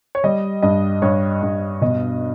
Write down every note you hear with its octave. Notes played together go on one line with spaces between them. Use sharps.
C#5
G3 D#5
G2 D#5
G2 C#5
G2
B2 D#5